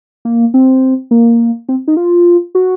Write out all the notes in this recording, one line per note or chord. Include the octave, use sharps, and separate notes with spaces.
A#3
C4
A#3
C4
D#4
F4
F#4